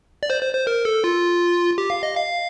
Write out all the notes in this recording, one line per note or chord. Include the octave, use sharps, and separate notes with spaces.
D5
C5
C5
C5
A#4
A4
F4
G4
F5
D#5
F5